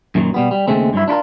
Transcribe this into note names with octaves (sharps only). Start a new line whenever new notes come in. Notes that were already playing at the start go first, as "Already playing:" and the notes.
F#2 A#2 D#3 F#3
B2 G3 B3
G3
D#2 G#2 C#3 G#3 A3 C4
G2 F#3 E4
D4 E4 F4 A#4